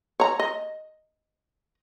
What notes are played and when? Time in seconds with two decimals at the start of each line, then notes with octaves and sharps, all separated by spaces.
0.20 C#5 A#5
0.39 D#5